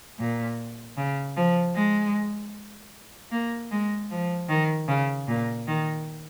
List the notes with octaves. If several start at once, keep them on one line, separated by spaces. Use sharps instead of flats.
A#2
C#3
F3
G#3
A#3
G#3
F3
D#3
C#3
A#2
D#3